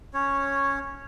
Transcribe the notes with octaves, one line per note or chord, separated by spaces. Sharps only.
C#4 C#5